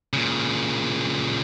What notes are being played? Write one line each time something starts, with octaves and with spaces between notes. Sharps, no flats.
A#2 C#3